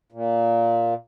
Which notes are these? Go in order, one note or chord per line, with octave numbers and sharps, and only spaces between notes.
A#2